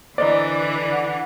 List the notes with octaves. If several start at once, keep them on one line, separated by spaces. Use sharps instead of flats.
D3 E3 C5 D5 D#5 A#5
F#5